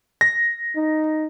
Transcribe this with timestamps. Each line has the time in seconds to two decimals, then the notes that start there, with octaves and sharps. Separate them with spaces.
0.21 A#6
0.76 D#4